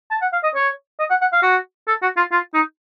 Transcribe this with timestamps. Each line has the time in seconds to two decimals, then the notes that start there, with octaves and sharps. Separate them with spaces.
0.11 A5
0.22 F#5
0.32 F5
0.43 D#5
0.55 C#5
0.99 D#5
1.10 F#5
1.21 F#5
1.32 F5
1.43 F#4
1.88 A4
2.02 F#4
2.17 F4
2.32 F4
2.54 D#4